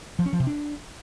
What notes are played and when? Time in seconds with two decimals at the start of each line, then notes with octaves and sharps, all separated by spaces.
0.19 F3
0.26 C#4
0.33 F3
0.40 C3
0.47 D4